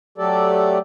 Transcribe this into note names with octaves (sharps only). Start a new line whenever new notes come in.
F#3 A3 G4 A4 D5